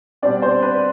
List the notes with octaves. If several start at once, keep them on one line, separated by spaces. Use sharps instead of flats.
B2 G3 C4 D4 D5
C5
B4